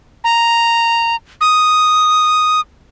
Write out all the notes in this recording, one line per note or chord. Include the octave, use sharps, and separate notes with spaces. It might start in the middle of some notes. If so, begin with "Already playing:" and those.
A#5
D#6